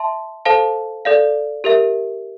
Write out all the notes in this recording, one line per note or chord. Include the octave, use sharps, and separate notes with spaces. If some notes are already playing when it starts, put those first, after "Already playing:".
Already playing: E5 A5 C6
A4 C5 F5 A5
A4 D5 F5
G4 A#4 E5